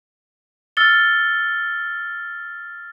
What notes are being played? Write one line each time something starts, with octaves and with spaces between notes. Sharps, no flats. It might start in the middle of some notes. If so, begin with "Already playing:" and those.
E6 F6 A6 C#7 G7